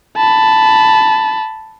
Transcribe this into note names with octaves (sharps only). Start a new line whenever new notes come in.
A5 B5